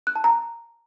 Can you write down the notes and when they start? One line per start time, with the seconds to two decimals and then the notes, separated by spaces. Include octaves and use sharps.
0.07 F#6
0.16 A5
0.24 A#5